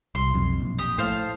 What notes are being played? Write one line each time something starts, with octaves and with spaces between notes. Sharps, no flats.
C2 C6
B1 F2
A#1
G4 D#6
A2 C5 F5 A5